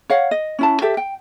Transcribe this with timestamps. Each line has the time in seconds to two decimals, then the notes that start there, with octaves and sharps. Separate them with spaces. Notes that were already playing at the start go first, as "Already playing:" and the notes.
0.10 C#5 F5 F#5
0.31 D#5
0.59 C#4 E4 A5
0.82 G4 A4 E5
0.97 G5